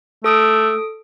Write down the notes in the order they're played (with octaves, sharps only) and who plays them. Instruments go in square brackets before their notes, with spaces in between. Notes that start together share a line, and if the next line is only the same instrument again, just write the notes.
[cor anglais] A3 [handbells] A4 D#6 D7